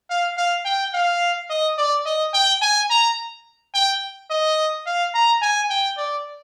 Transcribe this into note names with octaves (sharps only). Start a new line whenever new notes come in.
F5
F5
G5
F5
D#5
D5
D#5
G5
G#5
A#5
G5
D#5
F5
A#5
G#5
G5
D5